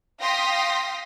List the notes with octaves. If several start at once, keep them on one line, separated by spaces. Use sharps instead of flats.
F5 G5 C6 D#6 A#6 B6